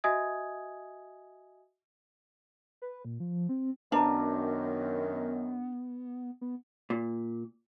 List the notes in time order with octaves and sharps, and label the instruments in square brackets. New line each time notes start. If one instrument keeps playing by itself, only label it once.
[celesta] F#4 D#5 E5 G#5 D#6 G#6
[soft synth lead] B4
A#2
F3
C4
[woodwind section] F#2 D#3 [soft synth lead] B3 [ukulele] D4 [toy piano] B4 A5 A#5
[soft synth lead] B3
[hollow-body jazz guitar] A#2